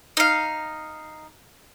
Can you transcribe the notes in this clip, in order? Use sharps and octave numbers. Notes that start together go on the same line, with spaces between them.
D#4 F5